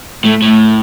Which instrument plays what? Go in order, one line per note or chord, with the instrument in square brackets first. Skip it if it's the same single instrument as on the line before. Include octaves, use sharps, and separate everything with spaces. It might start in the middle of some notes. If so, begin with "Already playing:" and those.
[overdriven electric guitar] A2 [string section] A3
[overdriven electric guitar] A2